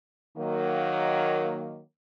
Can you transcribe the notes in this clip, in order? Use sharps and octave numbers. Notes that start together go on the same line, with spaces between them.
D#3 F#3 A#3